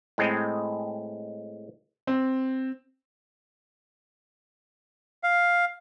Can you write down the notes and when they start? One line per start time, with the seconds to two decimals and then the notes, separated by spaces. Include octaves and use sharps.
0.18 A2 G#3 C4 D#5
2.07 C4
5.23 F5